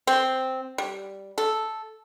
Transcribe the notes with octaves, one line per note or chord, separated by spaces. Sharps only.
C4
G3
A4